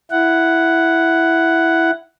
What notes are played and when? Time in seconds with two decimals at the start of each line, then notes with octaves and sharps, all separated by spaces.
0.11 E4 F#5